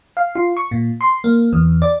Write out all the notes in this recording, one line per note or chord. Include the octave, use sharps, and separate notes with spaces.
F5
F4
C#6
A#2
C6
A#3
E2
D5